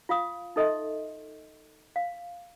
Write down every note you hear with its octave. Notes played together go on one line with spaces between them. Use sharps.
F4 F5 D#6
D#4 A4 D#5 E5 C6
F5